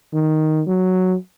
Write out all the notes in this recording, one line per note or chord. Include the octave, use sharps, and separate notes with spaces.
D#3
F#3